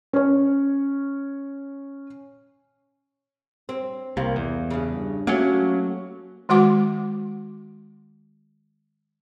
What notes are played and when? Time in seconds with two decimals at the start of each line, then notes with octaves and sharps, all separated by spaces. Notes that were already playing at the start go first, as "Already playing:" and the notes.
0.13 C#4 C#5
3.69 C4
4.17 C2 C3 A#3
4.36 E2
4.71 G2 C#3
5.27 F#3 A3 A#3 C#4 F#4
6.49 D#3 G#3 F#4 F#5 D6